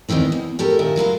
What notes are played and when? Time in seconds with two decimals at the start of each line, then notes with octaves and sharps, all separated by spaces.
0.09 E2 G#2 D#3 E3 C4
0.32 E2
0.59 A2 G4 A4 A#4
0.79 A#2 D#3 A#4 E5
0.96 F#3 E4 F4 A#4